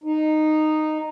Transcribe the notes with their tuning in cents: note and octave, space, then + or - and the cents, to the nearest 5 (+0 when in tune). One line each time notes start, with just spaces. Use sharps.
D#4 -10